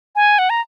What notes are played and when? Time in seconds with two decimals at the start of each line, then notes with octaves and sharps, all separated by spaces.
0.16 G#5
0.39 F#5
0.50 A#5